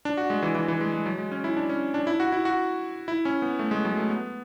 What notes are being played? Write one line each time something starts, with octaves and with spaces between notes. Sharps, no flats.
D4
F#4
G#3
E3
E3
E3
G#3
G#3
F#3
G#3
C#4
E4
D4
C#4
D4
E4
F#4
E4
F#4
E4
C#4
B3
A3
G#3
F#3
A3
B3